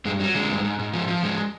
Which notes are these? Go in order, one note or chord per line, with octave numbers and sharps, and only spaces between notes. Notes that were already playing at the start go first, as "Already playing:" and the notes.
G2 G#3
F#3 G3
D3 G#3
G2
G#2
G#2
F3
F3
G#2 G#3